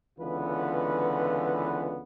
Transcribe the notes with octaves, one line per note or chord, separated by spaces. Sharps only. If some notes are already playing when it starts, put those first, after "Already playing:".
C#2 D3 E3 B3 F4 B4